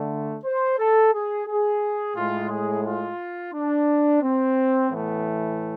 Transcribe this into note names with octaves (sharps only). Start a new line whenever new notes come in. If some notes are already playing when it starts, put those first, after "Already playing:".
Already playing: D3 A3
C5
A4
G#4
G#4
A2 G#3 F4
G#4
F4
D4
C4
A2 E3 A3 B3